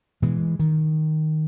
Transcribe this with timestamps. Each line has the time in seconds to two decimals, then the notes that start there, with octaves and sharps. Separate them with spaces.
0.22 B2 E3 G#3
0.59 D#3